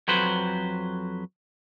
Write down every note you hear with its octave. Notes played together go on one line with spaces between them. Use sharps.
F2 F#3 B4 C5